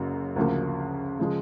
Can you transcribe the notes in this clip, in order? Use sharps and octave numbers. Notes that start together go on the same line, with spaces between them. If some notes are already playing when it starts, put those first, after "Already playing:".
Already playing: F#1 F#2 C#3 F#3
D2 C#3 F3 A#3
C#3 F3 G#3